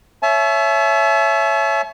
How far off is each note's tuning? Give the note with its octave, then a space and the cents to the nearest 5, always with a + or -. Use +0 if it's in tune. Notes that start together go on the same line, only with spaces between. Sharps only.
C#5 +0 E5 +15 A5 -45